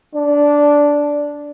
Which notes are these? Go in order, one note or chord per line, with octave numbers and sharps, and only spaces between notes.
D4